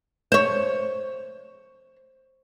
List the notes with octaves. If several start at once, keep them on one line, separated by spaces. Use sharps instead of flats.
C5 C#5